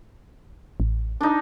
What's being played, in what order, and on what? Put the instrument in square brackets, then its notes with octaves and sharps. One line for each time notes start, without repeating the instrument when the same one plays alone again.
[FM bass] A1
[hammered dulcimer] D4 D#4